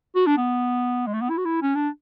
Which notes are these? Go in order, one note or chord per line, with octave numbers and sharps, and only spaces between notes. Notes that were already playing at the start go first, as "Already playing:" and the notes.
F#4
D4
B3
G#3
A3
B3
E4
F#4
E4
C#4
D4